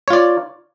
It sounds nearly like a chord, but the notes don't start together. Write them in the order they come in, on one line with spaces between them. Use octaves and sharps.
C#5 F4 D5